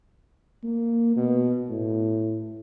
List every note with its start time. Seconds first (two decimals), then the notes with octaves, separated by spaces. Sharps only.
0.63 A#3
1.16 B2
1.69 A2